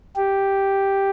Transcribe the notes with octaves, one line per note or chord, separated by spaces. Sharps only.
G4